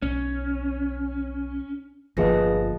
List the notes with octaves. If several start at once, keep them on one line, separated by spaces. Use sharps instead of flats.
B1 C#4
G1 G2 A#2 F3 G#4 B4 D#5 A#6